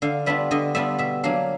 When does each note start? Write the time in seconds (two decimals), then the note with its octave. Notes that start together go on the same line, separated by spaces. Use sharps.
0.02 D3 F5
0.26 G3 B3 D4 F4 E5
0.51 D3 D#5
0.75 G3 B3 D4 F4 E5
0.98 B2 E5
1.23 F#3 A#3 D4 F5